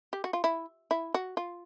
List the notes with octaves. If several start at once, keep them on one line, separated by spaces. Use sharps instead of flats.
G4
F#4
F4
E4
E4
F#4
F4